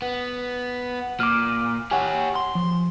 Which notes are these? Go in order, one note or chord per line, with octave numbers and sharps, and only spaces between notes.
B3
A#2 D6 F6
G4 C#5 F#5 G#5
C6
F3